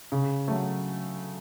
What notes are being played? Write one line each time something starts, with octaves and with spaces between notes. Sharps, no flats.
C#3
F#3 A3